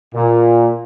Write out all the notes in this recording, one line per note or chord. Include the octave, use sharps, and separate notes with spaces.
A#2